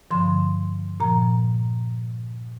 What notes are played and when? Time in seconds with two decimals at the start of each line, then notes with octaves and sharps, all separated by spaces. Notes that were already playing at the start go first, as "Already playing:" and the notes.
0.11 G2 D3 F3 C6
1.00 A#2 F3 A#5